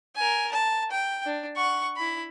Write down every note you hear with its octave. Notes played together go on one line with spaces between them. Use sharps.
A#4 G#5
A5
G5
D4
F#5 C#6
E4 B5